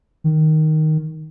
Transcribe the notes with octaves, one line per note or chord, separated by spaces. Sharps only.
D#3